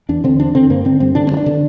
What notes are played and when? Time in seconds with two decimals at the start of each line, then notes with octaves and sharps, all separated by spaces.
0.09 E2 D4
0.24 D3 C4
0.39 E2 D4
0.55 D3 C4
0.70 G2 A#3
0.85 D3 C4
1.00 G2 C4
1.15 D3 D4
1.27 C4
1.31 G2
1.37 D4
1.46 D3